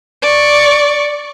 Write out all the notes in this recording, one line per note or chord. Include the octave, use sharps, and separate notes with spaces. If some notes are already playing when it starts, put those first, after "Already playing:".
D5 C#6